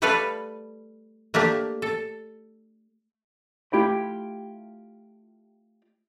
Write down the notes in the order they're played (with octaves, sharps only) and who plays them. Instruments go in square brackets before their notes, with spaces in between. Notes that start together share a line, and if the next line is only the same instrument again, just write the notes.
[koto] G3 A3 A4 B4 D5 F5
A3 A#3 D4 G4
A4
[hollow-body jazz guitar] A3 E4 F4 G4 G5 B5